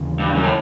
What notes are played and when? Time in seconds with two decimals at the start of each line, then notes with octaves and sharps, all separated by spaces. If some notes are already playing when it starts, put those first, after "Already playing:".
Already playing: D#2 C#3 E3 G3
0.20 G2
0.35 F#2
0.44 A2